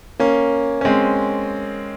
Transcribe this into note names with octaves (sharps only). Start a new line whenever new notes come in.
A#3 C#4
C#4
G#3 C4